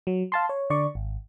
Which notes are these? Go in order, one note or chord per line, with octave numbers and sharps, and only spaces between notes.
F#3
F5 A5 C6
C#5
D3 D5 C#6
G#1